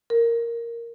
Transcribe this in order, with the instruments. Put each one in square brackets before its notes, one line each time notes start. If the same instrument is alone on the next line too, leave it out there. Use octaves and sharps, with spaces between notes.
[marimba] A#4